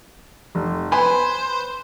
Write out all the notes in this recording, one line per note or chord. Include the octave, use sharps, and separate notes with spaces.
F1
B4 C5 G#5 B5